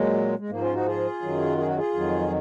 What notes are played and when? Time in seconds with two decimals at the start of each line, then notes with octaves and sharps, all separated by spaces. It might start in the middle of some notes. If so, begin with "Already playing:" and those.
Already playing: A#2 F#3 G#3
0.39 G#3
0.49 G#2 F3 A#3
0.61 C#4 F4
0.74 D#4 F#4
0.86 F4 G#4
1.22 F#2 D#3 F#3
1.58 G#4
1.67 F#4
1.77 F4 G#4
1.94 F2 D#3 F#3